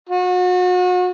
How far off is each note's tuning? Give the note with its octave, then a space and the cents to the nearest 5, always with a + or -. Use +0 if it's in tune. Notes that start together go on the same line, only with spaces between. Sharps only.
F#4 -35